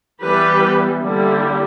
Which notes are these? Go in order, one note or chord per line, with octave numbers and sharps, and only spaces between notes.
E3 G3 B3 G4 B4
D3 G3 A#3 E4